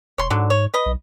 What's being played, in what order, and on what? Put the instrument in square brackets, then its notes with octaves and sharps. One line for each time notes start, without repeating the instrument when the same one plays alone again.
[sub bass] E1 [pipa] C#5 C6
[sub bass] G#2 [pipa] D3 F#3
[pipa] C#5
B4 D#5
[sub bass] B1